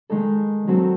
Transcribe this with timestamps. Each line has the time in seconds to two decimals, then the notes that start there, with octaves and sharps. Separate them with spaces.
0.10 D#3 G#3 D#4 A4
0.67 D#3 F#3 C4 F#4 A4